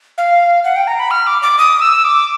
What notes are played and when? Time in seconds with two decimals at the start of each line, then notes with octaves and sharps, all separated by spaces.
0.18 F5
0.65 F#5
0.76 G5
0.87 A#5
0.99 B5
1.11 F6
1.27 D6
1.42 D6
1.58 D#6
1.81 E6
2.04 D6